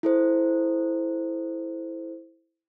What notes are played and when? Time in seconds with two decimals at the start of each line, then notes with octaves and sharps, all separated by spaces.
0.03 E4 A4 C5